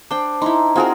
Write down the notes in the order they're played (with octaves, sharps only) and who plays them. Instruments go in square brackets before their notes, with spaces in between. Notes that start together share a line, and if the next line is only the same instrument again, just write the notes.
[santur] D4 [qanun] C5 G5
[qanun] D#4 E4 [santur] C6
[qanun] C4 F#4 A#4 [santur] F4 G#4